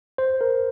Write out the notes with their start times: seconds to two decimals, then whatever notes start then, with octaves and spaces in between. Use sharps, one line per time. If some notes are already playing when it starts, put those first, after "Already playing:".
0.18 C5
0.41 A#4